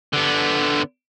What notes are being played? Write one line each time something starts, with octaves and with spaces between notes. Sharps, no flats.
D3 B3